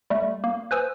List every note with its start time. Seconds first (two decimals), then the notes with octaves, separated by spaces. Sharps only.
0.10 G3 A3
0.44 A#3
0.71 B4 C5 G#5 D#6 E6